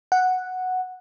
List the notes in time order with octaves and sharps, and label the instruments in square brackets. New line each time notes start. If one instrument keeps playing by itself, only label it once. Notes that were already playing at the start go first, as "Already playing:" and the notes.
[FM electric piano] F#5